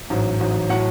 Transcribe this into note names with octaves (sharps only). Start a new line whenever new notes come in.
A1 G#2 F#3
A1 G#2 F#3
A2 F#3 F#5